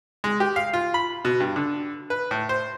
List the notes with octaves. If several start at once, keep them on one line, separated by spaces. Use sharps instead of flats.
G#3
G4
F5
F4
B5
B2
G2
D3
B4
A2
C5